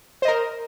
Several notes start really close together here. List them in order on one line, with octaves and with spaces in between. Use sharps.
C5 D#5 A#4